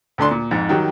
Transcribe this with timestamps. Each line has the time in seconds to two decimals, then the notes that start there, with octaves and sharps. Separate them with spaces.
0.18 D2 A3 D4 C6
0.31 A#2
0.51 F2 G#2
0.69 D#3 F#3 G3